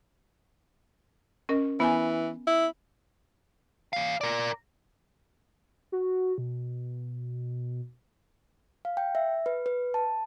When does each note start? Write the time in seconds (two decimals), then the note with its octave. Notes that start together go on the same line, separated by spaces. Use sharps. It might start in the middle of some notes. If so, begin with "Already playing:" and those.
1.49 C#4 A#4 D#5
1.80 E3 B3 E5 G#5
2.47 E4
3.93 E3 F5
4.21 A#4 D5
5.92 F#4
6.38 B2
8.85 F5
8.97 G5
9.15 E5
9.46 B4
9.66 B4
9.94 A5